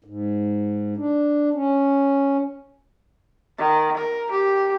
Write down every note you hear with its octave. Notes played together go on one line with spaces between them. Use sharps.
G#2
D4
C#4
D#3
A#4
G4